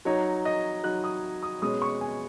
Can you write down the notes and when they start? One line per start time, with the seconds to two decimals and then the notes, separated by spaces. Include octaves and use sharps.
0.05 F#3 D#4 C#5
0.45 D#5
0.84 F#3 D#4 F#6
1.04 D#6
1.43 D#6
1.62 B2 G#3 C#4 D#6
1.82 C#6
2.01 G#5